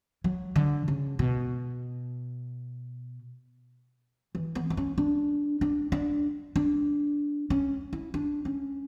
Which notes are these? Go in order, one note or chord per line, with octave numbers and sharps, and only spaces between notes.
F#3
D3
C#3
B2
E3
B3
B3
C#4
D4
D4
D4
D4
C#4
E4
D4
C#4